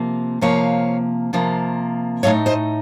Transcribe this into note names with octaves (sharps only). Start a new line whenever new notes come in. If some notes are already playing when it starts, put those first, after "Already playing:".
Already playing: C3 F3 A#3
C3 F3 A#3 C#5 F5
C3 F3 A#3
A2 A3 D#4 C#5 F5
C5 D#5